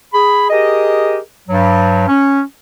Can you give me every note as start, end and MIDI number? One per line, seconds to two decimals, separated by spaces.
0.14 0.47 68
0.14 0.47 83
0.50 1.18 67
0.50 1.18 68
0.50 1.18 70
0.50 1.18 75
1.49 2.06 43
1.49 2.06 54
2.08 2.41 61